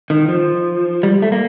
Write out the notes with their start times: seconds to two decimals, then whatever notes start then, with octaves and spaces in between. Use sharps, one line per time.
0.10 D#3
0.29 F3
1.03 G3
1.22 A3
1.32 A#3